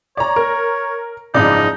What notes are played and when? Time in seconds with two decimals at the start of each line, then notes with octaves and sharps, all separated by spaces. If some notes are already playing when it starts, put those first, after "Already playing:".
0.17 C#5 D5 A#5
0.36 A#4
1.34 F#1 G#2 F3 D#4 D5